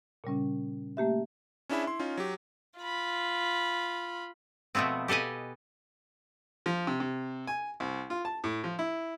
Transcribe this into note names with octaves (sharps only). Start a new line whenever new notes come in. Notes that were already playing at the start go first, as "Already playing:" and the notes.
A#2 C#3 G3 C#4
A3 A#3 G4 E5
C#4 D4 E4 G#4 E5 B5
E4 C6
C#4 D#4 F4
F#3 G4
F4 B5
B2 F3 A3 B3 C4
G4 A4 B4 D#5 G#5
F3
C3
C3
G#5
C2
F4
A5
A2
F3
E4